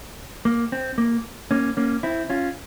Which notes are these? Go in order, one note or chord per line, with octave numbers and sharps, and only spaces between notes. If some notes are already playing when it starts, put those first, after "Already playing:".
A#3
C4
A#3
A#3 C#4
A#3 C#4
C4 E4
C#4 F4